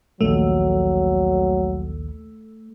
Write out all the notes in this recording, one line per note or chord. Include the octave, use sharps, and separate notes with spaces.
A#1 D#2 F#3 A3